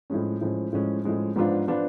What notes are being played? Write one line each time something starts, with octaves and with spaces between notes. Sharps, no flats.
A2 F3 G#3 C#4
A2 F3 G#3 C#4
A2 F3 G#3 C#4
A2 F3 G#3 C#4
G#2 F3 B3 D4 F4
F3 B3 D4 F4